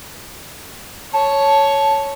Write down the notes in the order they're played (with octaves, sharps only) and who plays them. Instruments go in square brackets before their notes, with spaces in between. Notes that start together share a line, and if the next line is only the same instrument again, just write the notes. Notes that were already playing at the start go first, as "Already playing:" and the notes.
[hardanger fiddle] C#5 [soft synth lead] A5